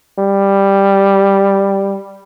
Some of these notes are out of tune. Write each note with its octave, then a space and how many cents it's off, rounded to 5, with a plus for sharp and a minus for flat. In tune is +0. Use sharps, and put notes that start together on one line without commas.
G3 +5